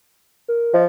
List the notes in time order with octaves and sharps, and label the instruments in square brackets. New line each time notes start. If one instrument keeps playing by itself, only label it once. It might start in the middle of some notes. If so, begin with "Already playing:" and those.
[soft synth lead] A#4
[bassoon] F3 [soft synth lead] D#5